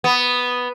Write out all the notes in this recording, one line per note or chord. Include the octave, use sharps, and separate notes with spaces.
B3